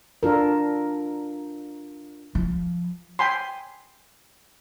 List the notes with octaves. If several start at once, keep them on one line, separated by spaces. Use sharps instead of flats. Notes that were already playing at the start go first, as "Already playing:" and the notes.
D4 F4 A4 A#4
F3
G5 G#5 B5 C6